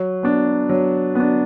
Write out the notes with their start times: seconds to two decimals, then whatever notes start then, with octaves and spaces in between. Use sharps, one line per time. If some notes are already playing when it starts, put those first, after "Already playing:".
Already playing: F#3
0.23 B3 D4
0.69 F#3
1.15 B3 D4